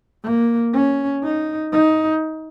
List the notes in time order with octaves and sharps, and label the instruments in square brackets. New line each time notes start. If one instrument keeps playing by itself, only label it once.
[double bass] A#3
C#4
D#4
D#4